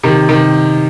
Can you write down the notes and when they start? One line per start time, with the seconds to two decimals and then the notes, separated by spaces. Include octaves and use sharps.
0.03 C3 D#3
0.29 C3 D#3